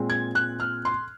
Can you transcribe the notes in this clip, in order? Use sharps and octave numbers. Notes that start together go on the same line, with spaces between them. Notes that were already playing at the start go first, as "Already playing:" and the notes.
Already playing: A#2 G#3 C4
G#6
F#6
F6
C6